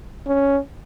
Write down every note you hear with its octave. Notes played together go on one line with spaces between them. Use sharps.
C#4